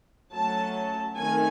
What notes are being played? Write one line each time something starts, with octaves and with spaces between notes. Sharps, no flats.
F#3 A3 C#4 A5
D#3 A3 C4 G#5